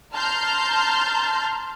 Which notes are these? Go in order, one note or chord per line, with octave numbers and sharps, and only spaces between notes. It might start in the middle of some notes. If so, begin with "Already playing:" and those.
A5 A#5 C6 F6 G6